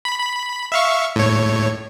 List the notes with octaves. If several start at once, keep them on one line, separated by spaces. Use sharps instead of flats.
B5
B5
E5 F5 C#6
A2 C#5